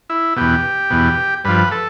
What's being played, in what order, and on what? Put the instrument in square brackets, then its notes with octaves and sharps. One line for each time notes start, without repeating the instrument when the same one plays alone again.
[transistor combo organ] E4
E2 B2 G4
E2 B2
G2 F3 B4
A4